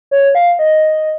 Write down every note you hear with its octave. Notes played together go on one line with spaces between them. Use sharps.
C#5
F5
D#5